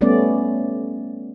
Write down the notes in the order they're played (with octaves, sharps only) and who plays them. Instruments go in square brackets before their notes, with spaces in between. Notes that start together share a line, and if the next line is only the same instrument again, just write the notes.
[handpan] G3 A3 B3 C#4 D5